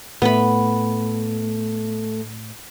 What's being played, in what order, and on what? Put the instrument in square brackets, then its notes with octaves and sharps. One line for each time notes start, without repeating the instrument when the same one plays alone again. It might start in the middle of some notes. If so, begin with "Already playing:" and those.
[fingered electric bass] A2 [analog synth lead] A3 [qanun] B3 B5